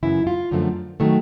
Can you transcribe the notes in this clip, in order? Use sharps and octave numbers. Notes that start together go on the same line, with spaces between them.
F#2 C#3 E3 E4
F4
F#2 D3 F3 A3
D#3 F#3 A3